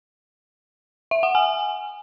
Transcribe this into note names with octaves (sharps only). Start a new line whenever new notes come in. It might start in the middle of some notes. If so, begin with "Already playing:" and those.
E5
F#5
G#5